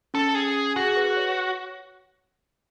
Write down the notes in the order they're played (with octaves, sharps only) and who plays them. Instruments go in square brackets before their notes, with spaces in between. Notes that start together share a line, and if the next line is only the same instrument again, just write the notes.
[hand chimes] C#4 [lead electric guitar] A4
[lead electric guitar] G#4
[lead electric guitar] F#4 [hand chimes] G#4
[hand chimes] B4
C#5